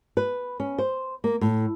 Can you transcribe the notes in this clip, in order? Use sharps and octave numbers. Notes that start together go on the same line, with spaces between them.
B4
C#4
C5
A#3
A2